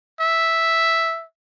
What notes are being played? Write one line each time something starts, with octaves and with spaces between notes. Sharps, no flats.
E5